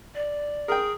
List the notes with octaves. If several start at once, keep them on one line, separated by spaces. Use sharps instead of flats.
D5
G#4 A#4 G5